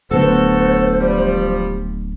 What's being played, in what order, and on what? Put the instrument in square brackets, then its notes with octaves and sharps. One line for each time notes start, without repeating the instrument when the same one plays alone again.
[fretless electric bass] D1 D2 B3 [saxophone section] F#4 A4 [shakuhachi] C5
[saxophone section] F3 G3